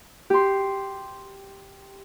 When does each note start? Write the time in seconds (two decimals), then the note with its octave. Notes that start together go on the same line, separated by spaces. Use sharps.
0.30 G4 C6